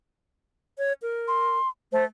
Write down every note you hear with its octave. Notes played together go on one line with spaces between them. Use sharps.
C#5
A#4
C6
A3 C5